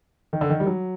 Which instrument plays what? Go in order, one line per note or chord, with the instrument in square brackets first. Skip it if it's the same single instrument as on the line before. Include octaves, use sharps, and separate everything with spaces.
[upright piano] D#3
D3
D#3
G3
F#3